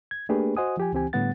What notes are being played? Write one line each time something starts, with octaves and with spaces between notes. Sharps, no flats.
G#6
A3 A#3 D4 G4 G#4 B4
F#4 C5 D#5 F#5 G#5 D#6
F3 G4 G#5
C#2 E3 C4 G4 G#5
A2 D3 G3 B3 F#5 A6